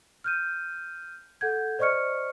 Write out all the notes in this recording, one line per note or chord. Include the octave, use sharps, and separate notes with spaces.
F6 G6 D#7
A4 F#5 G6 G#6
C5 D5 D#5 C#6 F6 C#7